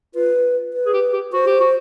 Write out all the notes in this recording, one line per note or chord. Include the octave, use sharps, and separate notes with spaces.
F4 B4
B4
G#4
G4
G4
F#4 C5
G4
F#4